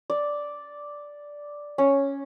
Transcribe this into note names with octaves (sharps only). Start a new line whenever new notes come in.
D5
C#4